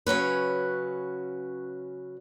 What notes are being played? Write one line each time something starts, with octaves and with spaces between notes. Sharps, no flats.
C#3 F#3 C#4 B4